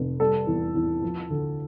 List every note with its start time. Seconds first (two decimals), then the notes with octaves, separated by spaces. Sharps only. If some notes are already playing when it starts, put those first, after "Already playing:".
Already playing: F1
0.20 G3 A4
0.47 E2
0.75 E2
1.02 F3
1.30 D2